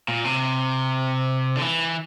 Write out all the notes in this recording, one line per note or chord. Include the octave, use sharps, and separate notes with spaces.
A#2
C3
D3
E3